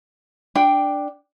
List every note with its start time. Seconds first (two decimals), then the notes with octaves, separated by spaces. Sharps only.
0.55 D4 G5